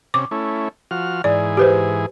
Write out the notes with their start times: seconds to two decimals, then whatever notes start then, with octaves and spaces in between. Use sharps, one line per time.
0.14 C3 C#4 D6
0.31 A3 C#4 E4
0.91 F3 F#4 F6
1.24 G#2 E3 G#4 D5
1.57 G4 B4 C5